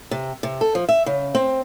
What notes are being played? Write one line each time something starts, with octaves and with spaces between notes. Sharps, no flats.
C3
C3
A4
F3
E5
C#3
C4